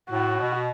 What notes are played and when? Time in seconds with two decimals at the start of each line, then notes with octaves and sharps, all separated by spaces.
0.10 A2 F#4
0.40 B2